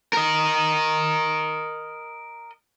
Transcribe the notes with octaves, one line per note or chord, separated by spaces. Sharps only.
A#4 D#5